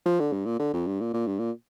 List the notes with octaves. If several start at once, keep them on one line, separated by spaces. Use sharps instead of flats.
F3
D3
G2
A#2
D3
F2
G2
A#2
A#2
G2
A#2